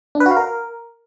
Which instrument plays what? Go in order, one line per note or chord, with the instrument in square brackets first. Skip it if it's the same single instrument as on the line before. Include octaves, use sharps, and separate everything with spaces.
[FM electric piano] D4
B4
F#4
F5
A#4